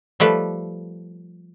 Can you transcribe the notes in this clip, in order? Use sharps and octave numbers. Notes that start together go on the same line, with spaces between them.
F3 G3 A3 B4